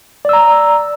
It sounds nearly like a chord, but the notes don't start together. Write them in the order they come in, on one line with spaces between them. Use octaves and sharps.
D5 E6 A#5